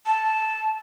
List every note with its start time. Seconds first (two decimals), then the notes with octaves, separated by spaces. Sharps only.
0.06 A5